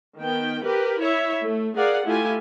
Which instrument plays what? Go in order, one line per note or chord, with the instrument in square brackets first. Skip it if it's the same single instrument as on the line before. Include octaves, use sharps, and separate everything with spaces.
[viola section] D#3 B3 G5
G4 A#4 B4
E4 C#5 E5
A3
G#4 A#4 D5 F5 F#5
A3 E4 F4 G4 G#5